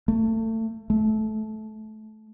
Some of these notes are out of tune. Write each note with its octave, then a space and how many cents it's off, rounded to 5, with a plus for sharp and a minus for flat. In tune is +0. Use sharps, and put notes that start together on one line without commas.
A3 +25
A3 -20